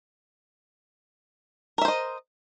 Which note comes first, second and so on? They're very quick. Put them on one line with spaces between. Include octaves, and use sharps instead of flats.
A#4 E5 C5 D#5